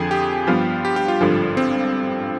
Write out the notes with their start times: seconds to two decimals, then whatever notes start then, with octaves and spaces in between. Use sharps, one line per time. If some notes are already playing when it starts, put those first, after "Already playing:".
Already playing: F2 D3 F3 G#4
0.11 G4
0.47 G2 F3 B3 F4
0.85 G4
0.96 G4
1.08 F4
1.21 G#1 G2 D3 F3
1.57 C4